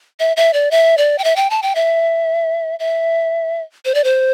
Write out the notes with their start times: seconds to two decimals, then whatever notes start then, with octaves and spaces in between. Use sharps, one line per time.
0.20 E5
0.37 E5
0.53 D5
0.71 E5
0.98 D5
1.18 G5
1.24 E5
1.36 G5
1.50 A5
1.62 G5
1.75 E5
2.80 E5
3.85 C5
3.94 D5
4.04 C5